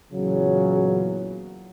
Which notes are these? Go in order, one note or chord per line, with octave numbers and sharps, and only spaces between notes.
E2 A#2 C#3 F#3